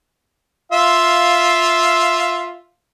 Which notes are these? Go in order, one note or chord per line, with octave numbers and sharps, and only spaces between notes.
F4 E5 F5